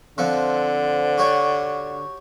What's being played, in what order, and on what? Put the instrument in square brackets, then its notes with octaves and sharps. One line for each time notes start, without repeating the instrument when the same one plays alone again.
[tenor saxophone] D3 [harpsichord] F3 C4 F#5
[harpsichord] F#4 G4 C#5